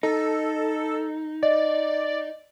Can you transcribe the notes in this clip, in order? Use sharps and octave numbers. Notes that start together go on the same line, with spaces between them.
D#4 A4
D5 D#5